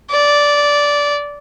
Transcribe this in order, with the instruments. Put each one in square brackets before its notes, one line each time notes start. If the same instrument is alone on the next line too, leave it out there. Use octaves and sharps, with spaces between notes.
[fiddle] D5